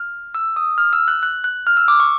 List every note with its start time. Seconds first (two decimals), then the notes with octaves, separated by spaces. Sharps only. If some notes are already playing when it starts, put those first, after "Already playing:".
Already playing: F6
0.35 E6
0.56 D#6
0.78 F6
0.93 E6
1.08 F#6
1.23 F#6
1.44 F#6
1.67 F6
1.77 E6
1.88 D6
2.00 C#6